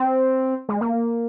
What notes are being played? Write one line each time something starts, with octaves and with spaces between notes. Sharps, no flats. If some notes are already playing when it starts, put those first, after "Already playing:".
Already playing: C4
G#3
A#3